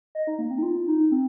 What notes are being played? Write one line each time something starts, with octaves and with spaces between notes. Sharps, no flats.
D#5
D#4
A#3
C4
D#4
F4
D#4
C4